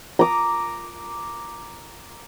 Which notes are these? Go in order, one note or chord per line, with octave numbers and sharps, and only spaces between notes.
A#5 D6 D#6